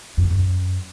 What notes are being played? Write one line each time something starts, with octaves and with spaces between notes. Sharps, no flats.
F2
D#3
F#2